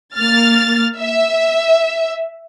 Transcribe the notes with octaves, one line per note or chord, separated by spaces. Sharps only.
A#3 F6 A6
E5